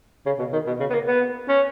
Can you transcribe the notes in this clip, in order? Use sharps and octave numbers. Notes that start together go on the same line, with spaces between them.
C#3
B2
D#3
B2
C#3
B3
A#3
B3
C#4